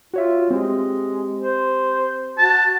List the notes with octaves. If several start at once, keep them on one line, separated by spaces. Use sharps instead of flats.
F4 F#4 C#5 E5
G#3 C4 G4
C5
F#4 A5